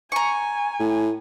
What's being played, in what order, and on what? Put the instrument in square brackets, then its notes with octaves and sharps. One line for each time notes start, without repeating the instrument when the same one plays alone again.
[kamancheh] G#5 [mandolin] A#5 C#6
[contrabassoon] A2